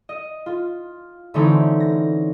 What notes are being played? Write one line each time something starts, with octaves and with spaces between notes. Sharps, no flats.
D#5
F4
D3 E3 A3 C4 C#4 D#4
A#6